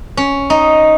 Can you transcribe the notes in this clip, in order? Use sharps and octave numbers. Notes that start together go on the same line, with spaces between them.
C#4
D#4